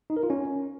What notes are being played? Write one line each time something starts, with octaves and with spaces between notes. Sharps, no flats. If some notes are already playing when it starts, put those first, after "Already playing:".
D#4
A#4
F4
C#4